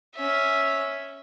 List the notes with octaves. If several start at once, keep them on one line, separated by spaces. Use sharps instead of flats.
C#4 E5